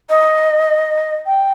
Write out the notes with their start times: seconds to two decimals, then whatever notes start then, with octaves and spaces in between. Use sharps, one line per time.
0.09 D#5
1.26 G5